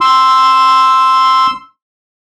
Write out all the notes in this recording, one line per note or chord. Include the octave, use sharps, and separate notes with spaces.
C6 E6